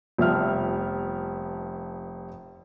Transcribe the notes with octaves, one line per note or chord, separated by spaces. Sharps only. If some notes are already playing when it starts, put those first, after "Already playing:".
F1 F3 G3 B3 E5 F6